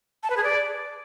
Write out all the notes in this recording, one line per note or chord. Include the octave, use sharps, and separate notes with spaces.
A5
B4
G#4
D5